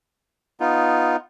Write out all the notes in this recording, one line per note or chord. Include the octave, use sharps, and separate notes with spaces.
B3 D#4 F4